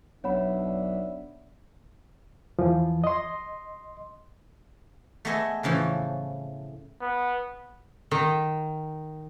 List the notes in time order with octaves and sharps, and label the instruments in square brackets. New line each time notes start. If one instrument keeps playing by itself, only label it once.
[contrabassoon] B1 [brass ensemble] D4 E5 [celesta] C#5 F#5 B5
[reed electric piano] E2 E3 F3
D#5 C6
[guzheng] A3 B3 G#4 D#5 E5 G#5
A2 C#3 E3 F3
[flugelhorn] B3
[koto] D#3